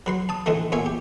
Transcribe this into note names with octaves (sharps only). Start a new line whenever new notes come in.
F#3 B4 C6
A5 D#6
G#2 D3 E3 G#3 A3
A#2 B3 C#5 E5 G#5
G4